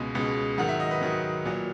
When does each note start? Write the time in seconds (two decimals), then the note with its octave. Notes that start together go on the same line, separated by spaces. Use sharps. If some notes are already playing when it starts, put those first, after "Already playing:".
Already playing: C#2 B2 G#3 G#5
0.15 C#2 B2 G#3
0.58 G#2 D#3 F#3 F#5
0.69 E5
0.80 D#5
0.91 B4
1.01 G#2 D#3 F#3
1.45 A#2 F#3